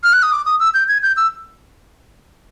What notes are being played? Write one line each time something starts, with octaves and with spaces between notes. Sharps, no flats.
F6
F#6
D#6
D6
D#6
E6
G6
G#6
G6
E6